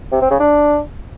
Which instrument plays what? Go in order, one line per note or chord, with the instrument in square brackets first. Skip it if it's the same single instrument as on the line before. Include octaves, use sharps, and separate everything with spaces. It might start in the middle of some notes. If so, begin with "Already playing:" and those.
[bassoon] C3
C4
C#3
D4